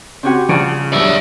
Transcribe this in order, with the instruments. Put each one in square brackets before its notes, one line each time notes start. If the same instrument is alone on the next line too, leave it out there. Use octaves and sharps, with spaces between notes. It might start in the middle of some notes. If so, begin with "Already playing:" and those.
[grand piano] C#3 G4 F#5 [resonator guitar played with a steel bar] C4 C#4 F#4
[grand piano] A#1 F#5 [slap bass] C#3 [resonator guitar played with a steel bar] G3 A3 F4
[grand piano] B1 E2 G2 [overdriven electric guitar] D5 E5